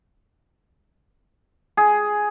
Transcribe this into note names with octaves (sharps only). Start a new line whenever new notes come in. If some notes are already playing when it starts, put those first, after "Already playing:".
G#4